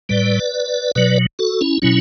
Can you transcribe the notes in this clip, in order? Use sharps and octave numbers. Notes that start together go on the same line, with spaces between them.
A2 G3 B4 D5
B2 F#3 B4 D5
F#4 A4
C#4 E4
B2 F#3 C#4 E4